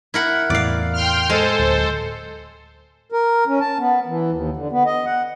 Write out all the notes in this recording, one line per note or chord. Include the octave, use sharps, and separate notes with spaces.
E4 A#4 F#5
E2 A2 D5 F5
G5 C6 F6
G#3 A4 C5
D1
A#4
C#4
A5
B3
E3
D#2
D3
B3
D#5
F#5